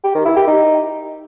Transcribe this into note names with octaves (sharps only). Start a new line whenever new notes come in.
G4
D#3
E4
G4
D#4